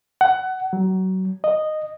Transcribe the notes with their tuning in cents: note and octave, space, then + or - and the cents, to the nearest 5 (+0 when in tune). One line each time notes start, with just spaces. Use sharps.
F#5 +20
F#3 +25
D#5 -10